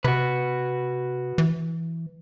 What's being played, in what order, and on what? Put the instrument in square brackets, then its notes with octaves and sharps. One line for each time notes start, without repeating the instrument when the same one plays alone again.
[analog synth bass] C3 [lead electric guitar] F#4 B4
[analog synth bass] E3